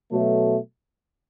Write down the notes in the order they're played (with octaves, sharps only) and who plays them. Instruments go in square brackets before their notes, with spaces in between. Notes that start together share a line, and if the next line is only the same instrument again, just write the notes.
[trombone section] B2 F#3 A3